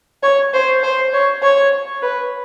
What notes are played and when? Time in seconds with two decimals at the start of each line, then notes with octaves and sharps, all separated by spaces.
0.23 C#5
0.54 C5
0.83 C5
1.13 C#5
1.43 C#5
2.02 B4